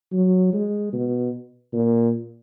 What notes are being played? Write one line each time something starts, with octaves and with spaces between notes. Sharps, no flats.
F#3
G#3
B2
A#2